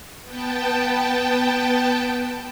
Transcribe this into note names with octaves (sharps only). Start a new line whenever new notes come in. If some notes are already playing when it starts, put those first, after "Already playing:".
B3 G5 A5